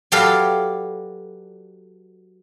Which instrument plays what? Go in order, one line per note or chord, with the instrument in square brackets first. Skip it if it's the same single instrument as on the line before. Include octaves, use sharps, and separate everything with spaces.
[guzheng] F#3 G4 A4 B4 D5 F5